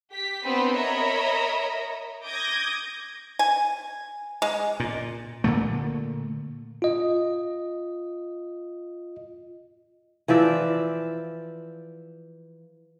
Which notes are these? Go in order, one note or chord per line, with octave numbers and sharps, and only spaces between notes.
G4 B6
B3 C4 D4 G4 B4
A#4 C#5 D#5 E5 A#5 B5
D6 D#6 G6 G#6 A#6
G#5
G#3
A#2
A#2 D3 A3
F4 D#5
E3 F3 D5 E5